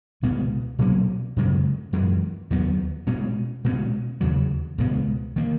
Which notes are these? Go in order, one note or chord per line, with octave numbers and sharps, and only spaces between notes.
C#2 B2 G#3 B3
B2 F#3 A#3 C#4
F#2 C#3 G#3
F#2 E3 G#3
D#2 D#3 F#3 B3
B2 G#3 C#4
B2 G#3 C#4
D#2 C#3 F#3
C#2 B2 G#3 B3
D#3 A#3